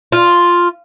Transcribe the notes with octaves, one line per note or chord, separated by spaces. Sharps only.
F4